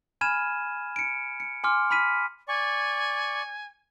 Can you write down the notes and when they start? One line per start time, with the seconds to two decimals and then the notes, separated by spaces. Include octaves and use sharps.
0.21 G#5 B5 F6 G#6 D#7 E7
0.96 C#7 D7
1.40 C#7
1.64 G#5 C6 D6 F6
1.91 B5 F6 B6 D#7
2.48 D5 G#5 C#6